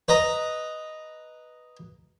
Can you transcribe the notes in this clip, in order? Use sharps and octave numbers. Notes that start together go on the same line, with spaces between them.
B4 D#5 A#5